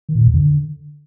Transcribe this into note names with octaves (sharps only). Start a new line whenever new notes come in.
D#3
A2
A#2
F2
D3